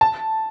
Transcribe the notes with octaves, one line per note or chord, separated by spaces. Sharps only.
A5